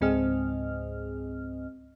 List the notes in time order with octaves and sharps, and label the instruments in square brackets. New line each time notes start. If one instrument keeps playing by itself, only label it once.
[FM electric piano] C#2 G#2 C4 G#4 D#5 F6